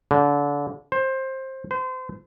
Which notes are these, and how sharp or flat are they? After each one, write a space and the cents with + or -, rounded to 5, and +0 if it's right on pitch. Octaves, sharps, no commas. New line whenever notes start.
D3 -30
C5 +20
C5 -30